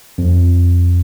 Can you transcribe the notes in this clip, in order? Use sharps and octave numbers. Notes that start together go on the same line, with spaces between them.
F2